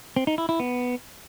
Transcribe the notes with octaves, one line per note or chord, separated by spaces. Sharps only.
C4
D#4
E4
E4
B3